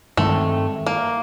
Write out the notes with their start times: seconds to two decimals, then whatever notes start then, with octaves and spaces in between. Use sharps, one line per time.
0.17 G2 D#3 G#3 A3 C4
0.86 A#3